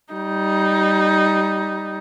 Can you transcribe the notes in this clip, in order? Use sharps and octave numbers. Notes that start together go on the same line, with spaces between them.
G3 D#4